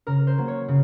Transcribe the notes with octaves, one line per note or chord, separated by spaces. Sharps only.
C#3 A#4
C5
F#3 A#3
C#5
C#3